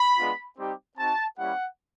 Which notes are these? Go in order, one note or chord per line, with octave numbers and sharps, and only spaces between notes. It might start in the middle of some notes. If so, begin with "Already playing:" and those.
Already playing: B5
G#3 B3 D4 F4
G3 C4 D#4 G4
C4 D#4 F#4 A5
G3 A#3 C#4 E4 G4 F#5